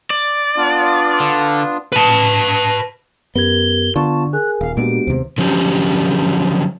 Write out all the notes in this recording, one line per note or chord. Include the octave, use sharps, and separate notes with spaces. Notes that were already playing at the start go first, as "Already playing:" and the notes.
D5
B3 D4 F4
D3
B4 A5
F#2 B3 G4 A#4 G#6 G7
D3 B3 F4 A5 C#6
G#4 A#4 G#5 F#6
D#1 F5
A#2 G#3 B3 D4 F#4 G4 D7
D#2 C3 C5
D3 F3 F#3 C#4 G4